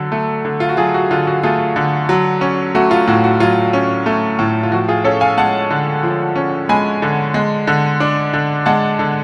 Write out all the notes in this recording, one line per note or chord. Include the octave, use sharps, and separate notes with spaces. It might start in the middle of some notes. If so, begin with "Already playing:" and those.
Already playing: D3 F#3 A4
A3
D3
F4
F#4
F#3 F4 G#4
F#4
D3 F4
F#4
A3 F4 G#4
D3
F#3
C#4
A3 F#4
F4
A2 F#4
F#4
F#3 F4
C#4
A3
A2
F4
F3 F#4
F4 G#4
C#4 A4 C#5
F5 G#5
G#3 F#5 A5
D3
F3
C#4
G#3 G#5 B5
D3
G#3
D3
D4
D3
G#3 F#5 A5
D3